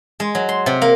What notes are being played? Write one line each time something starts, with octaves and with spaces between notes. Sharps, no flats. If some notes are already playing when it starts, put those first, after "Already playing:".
G#3
F#3
C6
C3
A#3